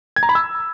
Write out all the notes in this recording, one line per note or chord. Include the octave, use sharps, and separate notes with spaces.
G#6
A#5
B5
E6